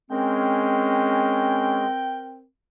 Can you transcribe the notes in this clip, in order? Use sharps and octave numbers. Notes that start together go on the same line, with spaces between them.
G#3 C4 C#4 A#4 G5